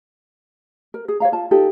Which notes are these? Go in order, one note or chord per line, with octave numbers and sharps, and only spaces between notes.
A#4
G#4
C#5 D5 F5 A#5
F4 A5
D#4 F4 G4 A4